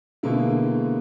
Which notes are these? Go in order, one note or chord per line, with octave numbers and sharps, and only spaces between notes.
B2 D3 G#3 A#3 E4